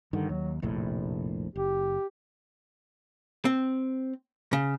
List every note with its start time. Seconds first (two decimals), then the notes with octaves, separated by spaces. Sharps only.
0.13 G2 D3 D#3
0.29 D#2 F#3
0.62 F1 A#1 A2 C3
1.56 F#1 G4
3.45 C4
4.53 C#3